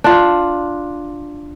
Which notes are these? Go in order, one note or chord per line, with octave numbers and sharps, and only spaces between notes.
D4 F4